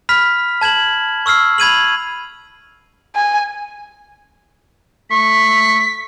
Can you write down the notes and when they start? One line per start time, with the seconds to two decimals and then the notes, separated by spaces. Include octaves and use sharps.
0.09 B5 F6 B6
0.61 A5 G#6 E7 F#7
1.26 C#6 E6 F6 C7
1.58 B5 G#6 D#7 F#7
3.15 G#5
5.10 A3 C#6 B6